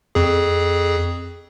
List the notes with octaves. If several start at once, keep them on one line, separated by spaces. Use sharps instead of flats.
F2 G#4